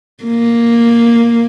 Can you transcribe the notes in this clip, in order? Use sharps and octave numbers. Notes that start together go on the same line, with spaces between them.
A#3